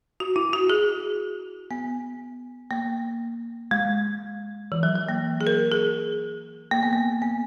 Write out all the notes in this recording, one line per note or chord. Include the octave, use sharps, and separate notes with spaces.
F#4
E4
F#4
G#4
B3
A#3
G#3
E3
F#3
F#3
A#3
G#4
A#4
G#4
A#3
B3
A#3
B3